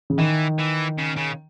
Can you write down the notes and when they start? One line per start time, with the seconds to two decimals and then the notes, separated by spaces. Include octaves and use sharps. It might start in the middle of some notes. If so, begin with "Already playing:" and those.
0.10 C#3
0.18 D#3 E3
0.58 E3
0.98 C#3
1.17 C#3